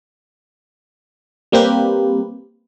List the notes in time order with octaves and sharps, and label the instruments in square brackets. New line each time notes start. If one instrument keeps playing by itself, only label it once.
[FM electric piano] G3 A#3 C4 G4 B4